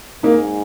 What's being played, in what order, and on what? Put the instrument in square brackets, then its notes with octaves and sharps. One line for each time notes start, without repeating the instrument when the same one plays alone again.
[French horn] G#2 [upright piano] A#3 D#4